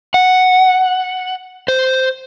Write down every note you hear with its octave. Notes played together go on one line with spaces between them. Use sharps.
F#5
C5